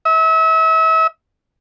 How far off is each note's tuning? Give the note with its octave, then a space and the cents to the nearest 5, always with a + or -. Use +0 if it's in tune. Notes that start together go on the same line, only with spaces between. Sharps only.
E5 -35